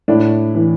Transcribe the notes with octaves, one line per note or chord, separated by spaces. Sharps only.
A2 D4 E4
E3